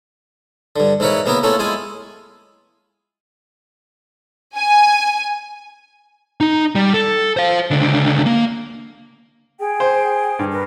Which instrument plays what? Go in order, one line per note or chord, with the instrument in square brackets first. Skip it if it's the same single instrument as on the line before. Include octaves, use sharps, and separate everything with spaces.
[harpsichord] G2 D3
G#2 E3 E4 A#4 B4 C#5
C#3 A#3 B3 E4 A#4
A3 A#3 C#4 E4 F4
G#3 E4 F4 G#5
[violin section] G#5
[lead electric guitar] D#4
G3
A4
C5 F5
C#2 D3
A#3
[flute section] G#4 G5
[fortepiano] C5
G2
[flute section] A#4 B4